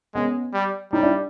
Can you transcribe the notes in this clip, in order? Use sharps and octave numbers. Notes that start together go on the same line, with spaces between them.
G#3 B3 C#4
G3
G3 C#4 D#4
D4 E4